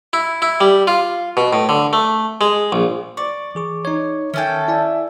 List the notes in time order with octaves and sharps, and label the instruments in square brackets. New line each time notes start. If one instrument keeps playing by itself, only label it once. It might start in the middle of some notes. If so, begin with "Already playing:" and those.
[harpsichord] E4
E4
G3
F4
B2
A2
D3
A3
G#3
A#1
[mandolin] D5 [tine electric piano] C#6
[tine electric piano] E3 G#4 C#6
D#4 C#5
[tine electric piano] D#3 C#5 G#5 [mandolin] C#4 A4 G5 [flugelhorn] E5
[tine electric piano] E4 D5 G#5